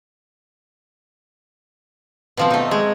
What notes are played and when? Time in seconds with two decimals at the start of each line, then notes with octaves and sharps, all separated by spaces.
2.37 B2 F3 C4
2.50 A3 D#4
2.71 G#3